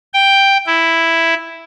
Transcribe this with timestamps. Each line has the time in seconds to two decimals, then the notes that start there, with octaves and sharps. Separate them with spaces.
0.14 G5
0.66 E4